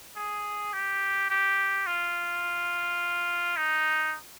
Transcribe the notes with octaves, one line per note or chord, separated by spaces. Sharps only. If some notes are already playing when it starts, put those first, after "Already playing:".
G#4
G4
G4
F4
D#4